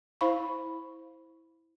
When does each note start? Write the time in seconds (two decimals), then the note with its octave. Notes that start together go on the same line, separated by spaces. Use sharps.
0.21 E4 C5 F5 B5 C#6